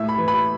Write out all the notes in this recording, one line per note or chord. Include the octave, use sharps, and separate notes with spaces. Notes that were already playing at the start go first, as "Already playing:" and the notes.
Already playing: A2 E5
B5
E3
B5